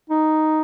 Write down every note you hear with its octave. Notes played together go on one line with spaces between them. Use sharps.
D#4